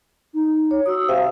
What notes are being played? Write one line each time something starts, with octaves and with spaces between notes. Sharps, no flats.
D#4
C#5
F#4 D#6 E6
C3 F5